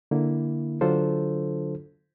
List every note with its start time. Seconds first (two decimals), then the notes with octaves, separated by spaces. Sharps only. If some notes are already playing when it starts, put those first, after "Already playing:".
0.11 D3 A#3 E4
0.81 D3 F#3 D4 F4 A4 C5